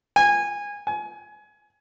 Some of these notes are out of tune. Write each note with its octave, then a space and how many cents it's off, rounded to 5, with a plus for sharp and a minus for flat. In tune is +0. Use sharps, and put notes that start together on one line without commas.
G#5 -20
G#5 +25